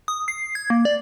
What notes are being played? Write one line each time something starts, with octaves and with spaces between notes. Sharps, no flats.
D#6
C7
G#6
A#3
D5